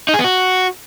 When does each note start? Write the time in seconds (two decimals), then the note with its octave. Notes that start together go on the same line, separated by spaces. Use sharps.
0.09 D#4
0.14 G#4
0.19 B3
0.24 F#4